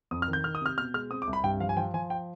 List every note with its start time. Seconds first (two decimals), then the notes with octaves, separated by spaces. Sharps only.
0.11 F2 D#6
0.22 F6
0.28 D#3
0.33 G6
0.44 D#3 F6
0.55 D#6
0.61 C3 F6
0.78 B2 F6
0.94 G#3 F6
1.11 C4 D#6
1.22 D6
1.27 C2
1.33 B5
1.44 G2 G5
1.60 F3 F5
1.69 G#5
1.77 F3 G5
1.94 F3 G#5
2.10 G5